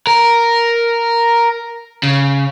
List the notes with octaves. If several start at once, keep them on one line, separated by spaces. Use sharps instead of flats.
A#4
C#3